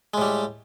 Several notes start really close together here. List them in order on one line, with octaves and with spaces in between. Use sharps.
G#3 A2 G3